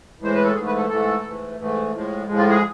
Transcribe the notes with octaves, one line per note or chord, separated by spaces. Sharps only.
A2 E3 G#3 C5
B4
A4
G#2 E3 A3 G#4
B4
A4
G#2 E3 A3 A4
G#2 E3 A3
G#2 E3 A3
A2 F3 G#3
A2 F3 G#3
F4
G#4